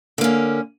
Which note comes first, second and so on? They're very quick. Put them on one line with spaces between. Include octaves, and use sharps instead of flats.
D3 A#3 C#4